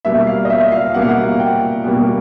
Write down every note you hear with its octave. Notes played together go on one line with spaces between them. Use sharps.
B2 G3 A#3 E5
F5
D#5
E5
F5
B2 G3 A#3 F#5
F5
F#5
G5
B2 G3 A#3